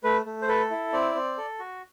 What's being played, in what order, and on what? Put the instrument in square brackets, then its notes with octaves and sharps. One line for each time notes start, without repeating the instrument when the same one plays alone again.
[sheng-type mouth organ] A3 B4
A3
C5
A4 B4
E4
C4 D5
C4
A4
F#4